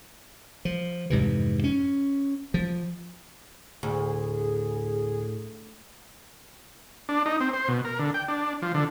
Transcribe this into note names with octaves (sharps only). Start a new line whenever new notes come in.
F3
F2 G#2 C3 E3
C#4
F3
D2 A2 G#4
D4
D#4
C4
C5
B2
A#4
D3
G5
D4
F3
D3